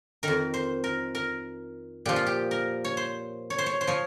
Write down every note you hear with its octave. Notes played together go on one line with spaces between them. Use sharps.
F2 D#3 A#4
C5
A#4
A#4
A#2 F3 G4
F4
G4
A#4
C#5
C5
C#5
C5
C#5
C5
F3 C#5